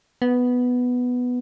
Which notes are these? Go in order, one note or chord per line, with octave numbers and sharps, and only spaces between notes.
B3